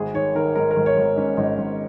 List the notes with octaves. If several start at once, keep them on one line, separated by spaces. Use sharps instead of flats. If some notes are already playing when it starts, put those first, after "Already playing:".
Already playing: G#1 G#4
D#3 C#5
D#3 A#4
G#2 A#4
A#4
G#1
C#5
G#1
A#4
G#2 C#4
G#1 D#4
G#1